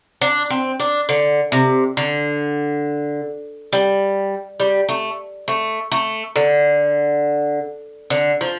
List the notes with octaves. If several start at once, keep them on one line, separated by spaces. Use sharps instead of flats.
D4
C4
D4
D3
C3
D3
G3
G3
A3
A3
A3
D3
D3
F3